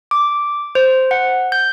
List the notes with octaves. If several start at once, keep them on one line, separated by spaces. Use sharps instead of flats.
D6
C5
F#5
G6